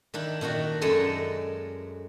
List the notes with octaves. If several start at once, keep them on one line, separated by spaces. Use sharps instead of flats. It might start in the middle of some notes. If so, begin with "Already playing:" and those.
D#3 D4 E4
A#2 D#3 D4 F#4
F#2 G#3 A3 A4 G#5 C6